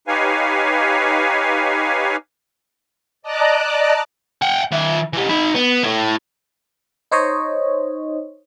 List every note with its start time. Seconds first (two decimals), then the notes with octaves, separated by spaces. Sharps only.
0.08 D#4 G4 B4 C#5 F5 G#5
3.22 D5 D#5 A5 A#5 D6 F#6
4.42 F#5 G5
4.72 D#3 E5
5.13 E3 G4
5.29 D#4 B5
5.55 B3
5.83 E4 A4
7.12 D#4 C5 C#5 D#5